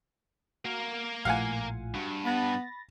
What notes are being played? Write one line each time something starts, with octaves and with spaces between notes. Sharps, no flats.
A#3 F#4 A#4
A#1 A2 F4 F5 F#5 G#5
G2 F#4
B3 B5 A6 A#6